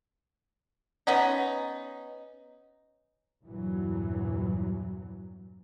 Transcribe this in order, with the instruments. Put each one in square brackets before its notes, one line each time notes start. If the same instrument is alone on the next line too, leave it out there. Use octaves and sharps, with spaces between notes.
[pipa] B3 C#4 D#4
[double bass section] E2 G2 A#2 E3 F#3